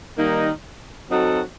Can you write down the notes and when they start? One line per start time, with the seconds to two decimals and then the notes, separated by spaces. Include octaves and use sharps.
0.18 D#3 G3 A#3 D#4
1.09 F#3 C4 D#4 F#4 A4